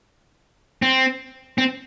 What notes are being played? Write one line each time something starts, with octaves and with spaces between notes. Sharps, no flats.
C4
C4